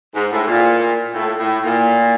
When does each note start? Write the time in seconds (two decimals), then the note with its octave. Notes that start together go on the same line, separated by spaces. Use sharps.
0.13 G#2
0.30 A2
0.47 A#2
1.14 A2
1.38 A2
1.64 A#2